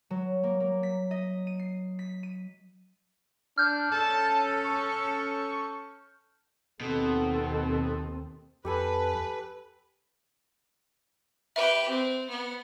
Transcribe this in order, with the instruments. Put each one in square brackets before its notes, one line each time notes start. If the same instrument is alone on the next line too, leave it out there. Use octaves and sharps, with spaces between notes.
[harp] F#3
A#3
A#3
B6
D#5
D#7
C7
B6
D#7
[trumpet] D4 [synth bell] F6 G6
[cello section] C#4 A4 [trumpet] A5
[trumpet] C#6
[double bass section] D#2 D#3 C4 [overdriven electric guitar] B2 [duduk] A4
[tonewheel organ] F2 [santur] G4 A4 G#5 [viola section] B4
[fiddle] G4 B4 [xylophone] E5
[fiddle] C4
B3